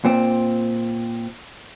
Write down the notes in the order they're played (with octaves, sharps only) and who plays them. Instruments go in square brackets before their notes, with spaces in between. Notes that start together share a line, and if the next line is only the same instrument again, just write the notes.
[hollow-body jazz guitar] A#2 C4